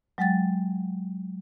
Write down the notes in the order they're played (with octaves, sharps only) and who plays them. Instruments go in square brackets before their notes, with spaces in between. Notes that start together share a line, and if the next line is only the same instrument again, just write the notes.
[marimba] F#3 G#3 F#5 G5 A6